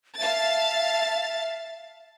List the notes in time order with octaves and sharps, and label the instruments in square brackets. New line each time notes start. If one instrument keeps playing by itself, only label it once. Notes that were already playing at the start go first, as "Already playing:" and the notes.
[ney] E5 [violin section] F5 A5 A6